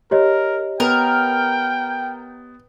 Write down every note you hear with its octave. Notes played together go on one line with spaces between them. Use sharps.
G4 A#4 C#5 D#5
B3 A#4 G5